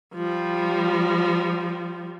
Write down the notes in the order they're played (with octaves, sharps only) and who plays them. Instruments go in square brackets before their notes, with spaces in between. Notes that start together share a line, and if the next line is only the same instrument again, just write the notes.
[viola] F3 G3